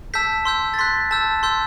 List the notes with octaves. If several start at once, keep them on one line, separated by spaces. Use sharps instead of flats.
A5 E6 G6 B6
C6 E6 G6
A6
C6 F#6 B6
A5 E6 G6
C6 E6 G6